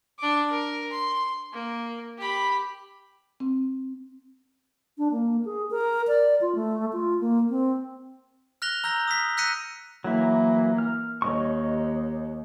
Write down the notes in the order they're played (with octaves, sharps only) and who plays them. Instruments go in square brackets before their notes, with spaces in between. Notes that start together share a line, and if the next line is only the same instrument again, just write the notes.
[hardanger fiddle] D4 D6
A#4
C6
A#3
G4 B5
[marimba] C4
[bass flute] D4
A#3
G#4
A#4
D5
F4
A3
F4
A#3
C4
[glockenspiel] F6 F#6 A#6 F7 G7
A#5 E6 G6 A#6
D#6 B6
E6 F#6 A#6 B6 C#7 D#7
[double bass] E3 A#3 [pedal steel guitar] F#3 E4
[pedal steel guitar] F6
[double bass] D#2 [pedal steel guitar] C#5 D#5 C#6